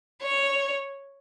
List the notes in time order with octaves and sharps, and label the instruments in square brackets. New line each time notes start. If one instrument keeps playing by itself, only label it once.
[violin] C#5